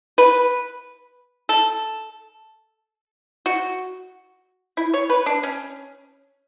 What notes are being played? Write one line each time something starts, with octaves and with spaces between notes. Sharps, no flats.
B4
A4
F#4
E4
C#5
B4
D4
C#4